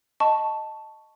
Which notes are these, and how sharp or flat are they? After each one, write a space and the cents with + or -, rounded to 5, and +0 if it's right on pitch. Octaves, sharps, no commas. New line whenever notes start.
D#5 +0 A5 +0 C#6 +0